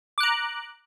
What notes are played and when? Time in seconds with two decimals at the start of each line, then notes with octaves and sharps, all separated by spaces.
0.18 D6
0.20 F#6
0.23 A#5